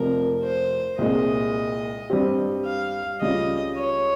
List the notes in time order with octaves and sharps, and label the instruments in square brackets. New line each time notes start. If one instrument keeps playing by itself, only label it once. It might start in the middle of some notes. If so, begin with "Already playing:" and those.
Already playing: [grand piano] F1 F2 C3 F3 [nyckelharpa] A#4
[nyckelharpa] C5
[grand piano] C2 A#2 G#3 [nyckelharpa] D#5
[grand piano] G2 G3 C4 G4
[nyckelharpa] F5
[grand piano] C#2 C#3 G3 C#4 F4 [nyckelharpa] D#5
[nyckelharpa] C#5